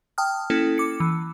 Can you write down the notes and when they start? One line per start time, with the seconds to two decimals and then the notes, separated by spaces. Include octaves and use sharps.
0.18 G5 A5 D#6 F6
0.50 A#3 C#4 E4 A4
0.78 D6 C#7
1.00 E3